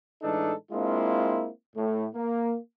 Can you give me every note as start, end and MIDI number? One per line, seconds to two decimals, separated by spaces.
0.22 0.53 45
0.22 0.53 52
0.22 0.53 56
0.22 0.53 62
0.22 0.53 63
0.22 0.53 69
0.72 1.49 56
0.72 1.49 58
0.72 1.49 60
0.72 1.49 62
0.72 1.49 64
0.72 1.49 65
1.76 2.05 45
2.14 2.55 58